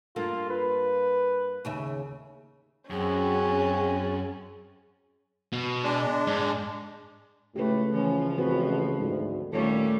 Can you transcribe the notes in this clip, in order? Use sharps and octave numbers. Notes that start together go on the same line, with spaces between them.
G2 A#3 F4 A4
B4
D#2 C#3 E5
F#2 C4 C#4 F#4 G#4
B2
G#3 D4
G#2
C#2 A2 A3 G4 B4
E3 F3 C#4
A1 C4 F#4 B4
D2 G#2
D#2 A#2 G3 A3 C#4 A4 C#5